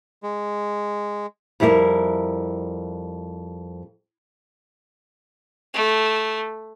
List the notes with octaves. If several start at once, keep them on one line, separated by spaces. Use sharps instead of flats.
G#3
F2 G3 E4 F#4 A#4
A3